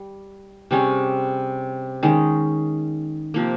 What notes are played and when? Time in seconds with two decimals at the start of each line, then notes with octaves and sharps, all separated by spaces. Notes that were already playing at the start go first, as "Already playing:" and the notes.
Already playing: G3
0.71 C3 G3 C#4 G#4
2.03 D#3 G#3 C#4
3.34 C3 F3 A#3